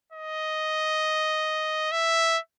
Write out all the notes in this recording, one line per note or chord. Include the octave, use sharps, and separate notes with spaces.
D#5
E5